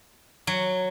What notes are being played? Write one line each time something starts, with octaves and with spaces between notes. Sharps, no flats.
F#3